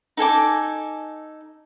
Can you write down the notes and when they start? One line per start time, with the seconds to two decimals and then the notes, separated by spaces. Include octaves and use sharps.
0.17 D#4 A4 G#5 D6